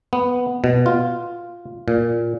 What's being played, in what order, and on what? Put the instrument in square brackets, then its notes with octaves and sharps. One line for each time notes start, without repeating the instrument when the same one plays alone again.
[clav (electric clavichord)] B3
B2
F4
A#2